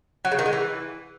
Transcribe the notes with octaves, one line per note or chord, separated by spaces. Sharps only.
F#3
C#3
D#3
G#3
E3